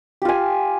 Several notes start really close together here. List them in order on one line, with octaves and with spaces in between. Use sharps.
G4 F4 G#5